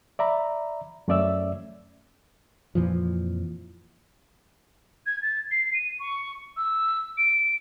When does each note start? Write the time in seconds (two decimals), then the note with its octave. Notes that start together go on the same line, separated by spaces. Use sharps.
0.19 D5 E5 A#5 B5
1.08 F#2 A3 C#4 D5 E5 E6
2.75 F2 A#2 E3 F3
5.06 G#6
5.22 A6
5.51 C7
5.74 D#7
6.00 C#6
6.57 E6
7.18 D7